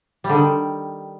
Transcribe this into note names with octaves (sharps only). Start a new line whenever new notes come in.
G3
D3
D#3